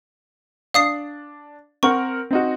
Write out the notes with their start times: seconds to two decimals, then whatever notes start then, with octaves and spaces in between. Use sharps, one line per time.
0.74 D4 F5 D#6 C7
1.83 C4 A#4 F#5 C#6
2.31 C4 D#4 F#4